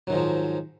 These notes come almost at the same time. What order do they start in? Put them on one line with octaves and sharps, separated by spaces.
F#3 D#3 G#2 F3